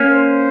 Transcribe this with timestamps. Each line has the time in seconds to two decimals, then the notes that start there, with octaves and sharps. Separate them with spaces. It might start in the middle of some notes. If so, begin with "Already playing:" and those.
Already playing: A#3 C#4
0.10 C5